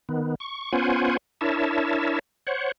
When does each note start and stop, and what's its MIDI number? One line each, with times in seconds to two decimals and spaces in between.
0.09 0.35 51
0.09 0.35 59
0.40 0.72 85
0.73 1.17 59
0.73 1.17 61
0.73 1.17 65
0.73 1.17 72
0.73 1.17 78
0.73 1.17 80
1.41 2.19 62
1.41 2.19 64
1.41 2.19 70
1.41 2.19 73
1.41 2.19 76
1.41 2.19 81
2.47 2.72 72
2.47 2.72 73
2.47 2.72 78